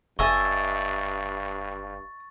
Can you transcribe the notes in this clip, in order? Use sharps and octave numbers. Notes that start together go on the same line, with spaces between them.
F#1 G2 D#5 E5 G#5 C#6 A6